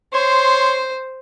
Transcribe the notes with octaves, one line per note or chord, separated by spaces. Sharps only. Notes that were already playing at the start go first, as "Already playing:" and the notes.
C5 C#5 C6